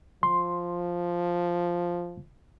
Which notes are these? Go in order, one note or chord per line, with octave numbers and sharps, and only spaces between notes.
F3 C6